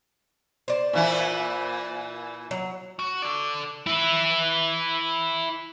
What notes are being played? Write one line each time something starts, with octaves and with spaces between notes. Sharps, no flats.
C5 D5
A#2 E3 E4
F#3
F#4
A4 D5
E4 B4